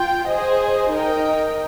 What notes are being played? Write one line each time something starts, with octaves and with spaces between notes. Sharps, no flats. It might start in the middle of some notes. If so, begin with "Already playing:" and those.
Already playing: F4 G5
G#4 C5 D#5
D#4 A#4 D#5 G5